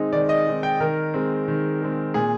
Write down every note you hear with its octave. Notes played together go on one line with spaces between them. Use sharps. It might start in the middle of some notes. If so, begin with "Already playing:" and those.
Already playing: D#3 G#3 C4 D#4
D#3 D5
D#5
G#3 C4 D#4
G5
D#3 A#4
G#3 C4
D#3
G#3 C4
A#2 G#4